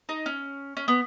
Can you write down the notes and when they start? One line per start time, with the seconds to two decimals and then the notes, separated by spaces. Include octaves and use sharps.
0.09 D#4
0.26 C#4
0.77 C#4
0.88 B3